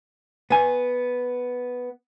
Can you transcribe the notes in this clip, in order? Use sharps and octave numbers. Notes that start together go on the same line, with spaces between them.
B3 G#5